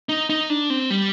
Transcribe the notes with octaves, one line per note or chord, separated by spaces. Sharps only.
D#4
D#4
D4
C4
G3